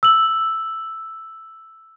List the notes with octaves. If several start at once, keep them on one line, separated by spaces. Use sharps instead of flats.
E6 F#7